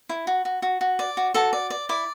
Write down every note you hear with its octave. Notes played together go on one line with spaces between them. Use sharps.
E4
F#4
F#4
F#4
F#4
D5
F#4
F#4 A4 A5
D5
D5
E4 D5 D6